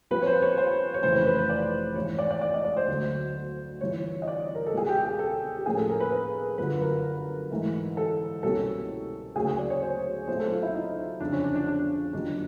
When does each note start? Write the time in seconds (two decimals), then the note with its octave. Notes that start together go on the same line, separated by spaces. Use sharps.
0.11 A#1 A#2 G3 C4 B4
0.22 C#5
0.26 C5
0.42 C#5
0.58 C5
0.94 C#5
1.03 F1 F2 C#3 E3 C5
1.15 B4
1.26 B4
1.38 B4
1.49 D5
1.95 G#1 G#2 E3 C#5
2.19 D5
2.31 D5
2.41 D5
2.54 D#5
2.65 D5
2.77 C5
2.88 D2 D3 F#3 C5
3.81 G1 G2 E3 C#5
4.22 D#5
4.28 D5
4.55 A#4
4.66 A4
4.74 C#2 B2 G3 G#4
4.89 G4
5.04 G#4
5.19 A4
5.58 G4
5.66 A#1 A2 F3 A#3 C#4 G#4
5.77 A4
5.89 A#4
6.00 B4
6.12 B4
6.58 G1 F#2 D3 B4
6.82 A#4
7.51 G#2 E3 A3
7.97 A4
8.43 C2 B2 G3 A#3 C#4 A4
9.36 D2 C#3 F#3 A#3 C#4 G#4
9.47 G#4
9.59 D5
9.70 C#5
9.82 C5
10.28 B1 A#2 F#3 A3 C4 C5
10.40 A4
10.51 F4
10.63 E4
10.74 D#4
11.20 G1 F2 C#3 D4
11.32 C#4
11.44 D4
11.56 D4
11.67 D4
12.13 G1 F#2 D#3 G3 A#3 D4